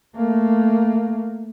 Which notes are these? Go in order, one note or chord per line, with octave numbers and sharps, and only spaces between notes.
A3 A#3